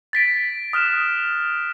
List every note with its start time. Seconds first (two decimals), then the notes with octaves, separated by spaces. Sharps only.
0.13 A6 B6 D7
0.73 D#6 F6 F#6 E7